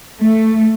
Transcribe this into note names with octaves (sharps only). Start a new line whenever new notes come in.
A3